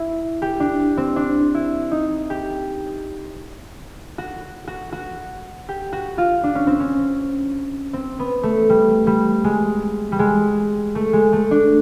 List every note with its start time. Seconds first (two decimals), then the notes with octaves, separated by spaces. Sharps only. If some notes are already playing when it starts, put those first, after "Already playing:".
Already playing: E4
0.42 G4
0.60 D4
0.97 C4
1.16 D4
1.55 E4
1.91 D#4
2.30 G4
4.18 F#4
4.68 F#4
4.93 F#4
5.69 G4
5.93 F#4
6.18 F4
6.44 D4
6.55 C#4
6.67 C4
6.80 C#4
7.93 C4
8.19 B3
8.43 A3
8.70 G3
9.07 G3
9.44 G#3
10.12 G3
10.19 G#3
10.95 A3
11.13 G#3
11.33 A3
11.51 D4